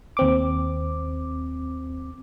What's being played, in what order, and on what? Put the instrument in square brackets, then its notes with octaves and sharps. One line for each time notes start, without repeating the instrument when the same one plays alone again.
[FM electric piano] D#2 C4 D6